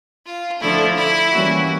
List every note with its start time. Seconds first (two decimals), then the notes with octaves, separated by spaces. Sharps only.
0.26 F4
0.61 D3 F3 A3 D4 E4
0.97 E4
1.32 E3 G3 A#3 C#4 F#4